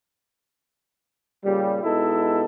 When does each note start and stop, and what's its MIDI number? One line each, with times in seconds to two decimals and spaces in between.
1.44 1.80 46
1.44 1.80 49
1.44 1.80 55
1.83 2.45 47
1.83 2.45 56
1.83 2.45 63
1.83 2.45 64
1.83 2.45 69